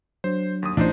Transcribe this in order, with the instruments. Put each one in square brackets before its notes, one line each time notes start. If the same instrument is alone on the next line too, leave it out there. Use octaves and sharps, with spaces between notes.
[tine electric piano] F#3 D4 [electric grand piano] C5
[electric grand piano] D#2 D#6
[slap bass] A1 [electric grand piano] D4 D#4 C5